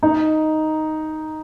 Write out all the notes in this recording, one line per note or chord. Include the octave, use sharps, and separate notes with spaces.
D#4